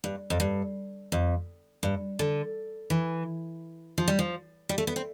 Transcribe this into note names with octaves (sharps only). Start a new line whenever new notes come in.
G2
F2
G2
F2
G2
D3
E3
F3
G3
F3
G3
A3
B3
C4